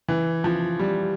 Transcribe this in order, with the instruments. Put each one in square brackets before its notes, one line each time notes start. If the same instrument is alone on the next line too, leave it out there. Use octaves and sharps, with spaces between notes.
[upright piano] E3
F3
G3